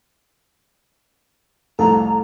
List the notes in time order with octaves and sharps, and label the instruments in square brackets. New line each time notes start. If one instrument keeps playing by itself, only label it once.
[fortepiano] C2 F2 A2 [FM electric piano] A4 [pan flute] A#5